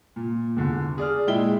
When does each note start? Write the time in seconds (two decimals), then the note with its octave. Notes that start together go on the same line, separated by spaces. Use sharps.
0.16 A#2
0.56 E2 D3
0.98 G#4 D5 F6
1.27 A#2 G#3 E4 G5 G7